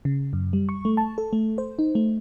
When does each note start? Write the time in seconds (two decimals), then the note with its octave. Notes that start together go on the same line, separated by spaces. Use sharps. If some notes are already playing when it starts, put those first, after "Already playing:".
0.05 C#3
0.33 F#2
0.53 G3
0.69 C#6
0.85 A3
0.97 A5
1.18 A4
1.33 A3
1.58 C5
1.79 D#4
1.95 A3